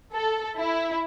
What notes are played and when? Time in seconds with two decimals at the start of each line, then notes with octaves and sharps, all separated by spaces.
0.13 A4
0.58 E4